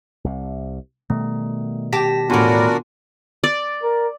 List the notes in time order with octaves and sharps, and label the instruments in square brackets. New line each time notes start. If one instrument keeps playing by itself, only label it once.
[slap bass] C2 C3
[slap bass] B2 D#3 G3 [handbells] A3
[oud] G4 [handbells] A5 A#6 B6
[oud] E2 A2 [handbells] B3 F4 G#5 [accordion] D4 F#4 A#4
[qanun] D5
[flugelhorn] A#4